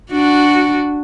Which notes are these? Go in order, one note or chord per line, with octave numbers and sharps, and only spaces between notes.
D4 F#4